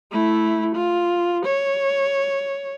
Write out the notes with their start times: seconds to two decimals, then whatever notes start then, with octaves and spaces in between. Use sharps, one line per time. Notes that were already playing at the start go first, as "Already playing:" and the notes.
0.12 A3 E4
0.76 F4
1.46 C#5